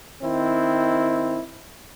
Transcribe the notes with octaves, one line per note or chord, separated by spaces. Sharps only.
D#3 C4 E4